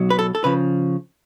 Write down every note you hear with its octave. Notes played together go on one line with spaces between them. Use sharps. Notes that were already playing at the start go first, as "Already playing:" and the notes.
Already playing: B1 B2 F#3
B4
A4
A4
C#3 F3 B4